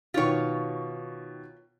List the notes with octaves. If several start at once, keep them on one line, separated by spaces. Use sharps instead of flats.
B2 D#3 F4 G4 C#5